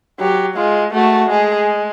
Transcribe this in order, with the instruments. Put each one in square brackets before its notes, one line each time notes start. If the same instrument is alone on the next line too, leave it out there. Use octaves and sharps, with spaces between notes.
[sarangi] F#3 [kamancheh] G4
[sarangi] G#3 [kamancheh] F4
[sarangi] A3 [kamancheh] F#4
[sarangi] G#3 [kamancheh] G#4